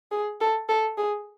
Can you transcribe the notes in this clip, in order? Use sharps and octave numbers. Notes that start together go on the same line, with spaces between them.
G#4
A4
A4
G#4